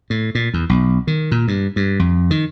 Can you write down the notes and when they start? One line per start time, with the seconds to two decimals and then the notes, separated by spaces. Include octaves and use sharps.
0.10 A2
0.35 A#2
0.54 E2
0.69 B1
1.07 D#3
1.31 A#2
1.48 G2
1.76 G2
1.99 F2
2.31 D#3